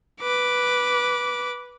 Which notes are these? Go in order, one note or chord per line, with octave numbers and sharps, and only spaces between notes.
B4 D6